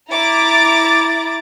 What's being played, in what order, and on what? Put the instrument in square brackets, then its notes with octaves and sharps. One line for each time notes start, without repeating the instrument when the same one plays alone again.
[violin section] E4 A#5 D6 A6